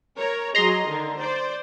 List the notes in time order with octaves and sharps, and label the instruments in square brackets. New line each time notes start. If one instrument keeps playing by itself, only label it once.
[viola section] A#4 C#5 A#5
[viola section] F#3 G#4 D#5 [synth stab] A#5 C6
[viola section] D3 D#3
C5 D5